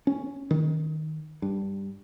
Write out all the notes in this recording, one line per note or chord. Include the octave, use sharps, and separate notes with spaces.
C#4
D#3
G2